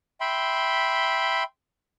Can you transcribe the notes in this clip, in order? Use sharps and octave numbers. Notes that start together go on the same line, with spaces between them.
E5 G5 B5 C6